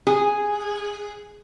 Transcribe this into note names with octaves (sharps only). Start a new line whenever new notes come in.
G#4